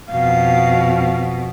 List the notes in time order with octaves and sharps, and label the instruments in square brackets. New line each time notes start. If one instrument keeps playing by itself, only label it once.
[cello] F2 B2 [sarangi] F5